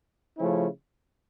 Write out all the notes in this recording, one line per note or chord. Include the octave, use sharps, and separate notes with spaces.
C#3 F3 A3 C#4 E4